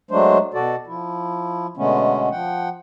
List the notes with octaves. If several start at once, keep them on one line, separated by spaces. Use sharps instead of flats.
F#3 G#3 A3 D4 C5
B2 F#4 A4 D5
F3 E4
B2 D3 G#3 A3 B3 C#4
F3 F#5 G5